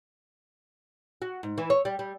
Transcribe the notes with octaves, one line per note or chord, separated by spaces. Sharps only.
F#4
G#2
E3
C#5
G3
G3